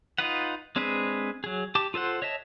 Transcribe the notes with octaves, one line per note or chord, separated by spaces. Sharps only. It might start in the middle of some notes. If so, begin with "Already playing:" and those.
D#4 F4 B4 F#5
G#3 C4 D4 G#4 B4
F#3 G#4
G4 A5 D6
F4 A4 C5 F#5
C#5 D#5 E5 A5